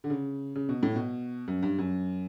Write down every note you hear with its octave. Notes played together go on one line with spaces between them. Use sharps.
D3
C#3
C#3
B2
A2
B2
F#2
G2
F#2